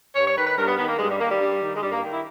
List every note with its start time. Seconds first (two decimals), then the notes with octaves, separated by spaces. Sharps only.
0.16 G2 C#5
0.27 C#5
0.37 D#3 B4
0.47 B4
0.57 G2 A#4
0.68 B3
0.78 D#3 B3
0.88 A#3
0.99 G2 G#3
1.09 G3
1.19 D#3 A#3
1.30 G3
1.40 G2
1.61 D#3
1.76 G#3
1.81 G2 G3
1.92 A#3
2.02 D#3
2.13 E4